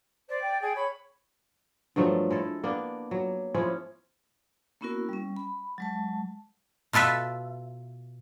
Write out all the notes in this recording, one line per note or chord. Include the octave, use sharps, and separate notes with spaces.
C5 D5
G5
G#4 G5
C#5 B5
G2 F3 F#3 A3
G#3 E4 A4
A#3 B3 D4
F#3
F3 G#3 C#4 E4
A#3 B3 C#4 E4 F#4 A#4
G3 C#4
B5
F#3 G#3 A5
B2 F4 A4 B4 E5